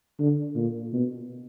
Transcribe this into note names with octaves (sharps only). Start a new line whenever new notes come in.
D3
A#2
B2